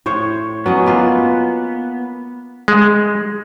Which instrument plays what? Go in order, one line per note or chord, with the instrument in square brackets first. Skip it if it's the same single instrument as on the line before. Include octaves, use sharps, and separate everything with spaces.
[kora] A2 C5 C#5
[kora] F#3 C#4 D#5 [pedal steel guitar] B3
[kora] A#3 F4
[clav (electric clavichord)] G#3